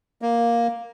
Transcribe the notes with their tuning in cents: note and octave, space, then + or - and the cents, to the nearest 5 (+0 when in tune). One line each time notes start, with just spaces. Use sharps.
A#3 +5